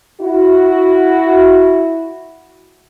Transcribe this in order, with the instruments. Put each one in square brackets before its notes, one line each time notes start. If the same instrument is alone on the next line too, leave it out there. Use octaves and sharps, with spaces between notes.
[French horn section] E4 F#4